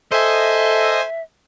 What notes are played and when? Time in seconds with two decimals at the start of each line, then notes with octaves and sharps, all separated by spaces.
0.12 A4 C5 D#5 E5 G#5